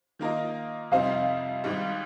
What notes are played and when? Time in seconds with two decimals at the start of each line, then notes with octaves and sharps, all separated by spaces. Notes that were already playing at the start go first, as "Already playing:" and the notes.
0.19 D#3 A#3 F4 A#4 D#5
0.91 F2 C3 G3 C4 D#4 F5
1.64 G#1 G#2 G3